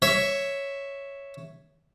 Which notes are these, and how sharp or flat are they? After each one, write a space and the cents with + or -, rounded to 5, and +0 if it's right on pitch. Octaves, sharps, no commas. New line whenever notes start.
C#5 +0 E5 +0